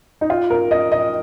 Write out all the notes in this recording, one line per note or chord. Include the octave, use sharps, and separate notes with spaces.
D#4
F4
A#4
D#5
D#5